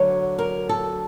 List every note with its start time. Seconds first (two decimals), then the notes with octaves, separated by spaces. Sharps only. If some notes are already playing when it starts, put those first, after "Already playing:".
Already playing: D2 D3 F#3 C#5
0.39 A#4
0.69 A4